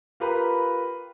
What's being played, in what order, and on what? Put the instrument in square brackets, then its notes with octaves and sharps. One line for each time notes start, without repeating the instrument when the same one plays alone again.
[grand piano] F4 G4 A#4 B4 A#5 B5